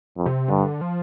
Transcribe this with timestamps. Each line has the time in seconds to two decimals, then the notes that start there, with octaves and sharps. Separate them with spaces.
0.17 F2
0.26 C3
0.49 G2 D3
0.81 F3